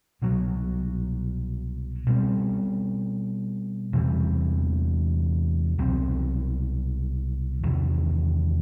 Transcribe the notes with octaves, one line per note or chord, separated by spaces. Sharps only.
C2 B2 F#3
B2 G3 C4
E2 C3 E3 G3
C2 B2 F#3 C4
E2 C3 D#3